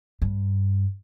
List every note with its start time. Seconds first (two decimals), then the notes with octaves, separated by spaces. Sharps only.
0.22 G2